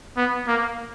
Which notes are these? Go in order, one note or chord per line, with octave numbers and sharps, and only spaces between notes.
B3
A#3